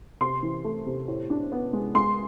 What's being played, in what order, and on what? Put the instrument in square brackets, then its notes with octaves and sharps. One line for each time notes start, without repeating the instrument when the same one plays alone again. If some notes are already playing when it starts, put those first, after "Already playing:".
[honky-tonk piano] C3 C6
E3
A3
C3
A2
D4
B3
G#3
G#3 C6